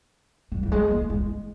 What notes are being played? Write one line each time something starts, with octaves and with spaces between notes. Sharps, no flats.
G3
G3
G#3
A#3
G#3